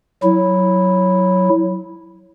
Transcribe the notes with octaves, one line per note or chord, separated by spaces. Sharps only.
F#3 E4